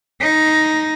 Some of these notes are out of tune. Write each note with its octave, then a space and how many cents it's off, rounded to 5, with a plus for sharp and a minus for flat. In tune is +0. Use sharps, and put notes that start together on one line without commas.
D#4 +5